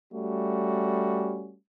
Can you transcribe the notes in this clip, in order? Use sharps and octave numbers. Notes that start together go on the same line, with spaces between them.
G3 A3 C#4 F#4